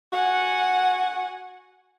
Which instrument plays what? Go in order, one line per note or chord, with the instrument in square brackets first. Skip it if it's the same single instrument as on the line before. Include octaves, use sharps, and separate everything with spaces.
[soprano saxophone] F#4 [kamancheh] F#5 G#5